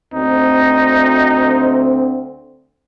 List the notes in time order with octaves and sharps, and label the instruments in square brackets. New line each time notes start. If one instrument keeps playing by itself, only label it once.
[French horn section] D2 C4 [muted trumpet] D#4